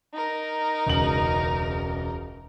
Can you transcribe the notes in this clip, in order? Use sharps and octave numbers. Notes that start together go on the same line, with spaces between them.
D#4 A#4
E1 C#2 F#7